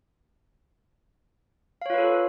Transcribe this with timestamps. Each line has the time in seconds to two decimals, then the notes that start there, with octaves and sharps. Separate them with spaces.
1.82 F5
1.86 C#5
1.90 F4
1.94 B4
1.98 A4